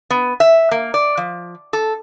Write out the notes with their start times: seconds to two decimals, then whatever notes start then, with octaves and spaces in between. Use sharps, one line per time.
0.10 B3
0.40 E5
0.71 A#3
0.94 D5
1.17 F3
1.73 A4